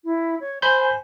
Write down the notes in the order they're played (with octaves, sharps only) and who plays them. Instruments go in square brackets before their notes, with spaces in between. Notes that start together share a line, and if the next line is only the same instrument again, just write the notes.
[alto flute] E4
C#5
[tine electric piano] C5 B5 G6 [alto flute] G#5
[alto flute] G#5